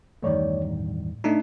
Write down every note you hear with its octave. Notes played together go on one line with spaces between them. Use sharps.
E2 G2 D#3 A3 C#5 D5
A2
A3 D4 D#4